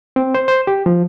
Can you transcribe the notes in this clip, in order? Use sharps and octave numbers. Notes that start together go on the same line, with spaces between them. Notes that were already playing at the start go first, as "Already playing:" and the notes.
C4
C5
C5
G4
F3